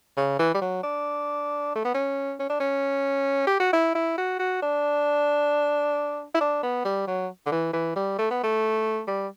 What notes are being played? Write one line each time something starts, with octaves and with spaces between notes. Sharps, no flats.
C#3
E3
G3
F#3
D4
A3
B3
C#4
C#4
D4
C#4
G4
F#4
E4
E4
F#4
F#4
D4
E4
D4
B3
G3
F#3
D3
E3
E3
G3
A3
B3
A3
G3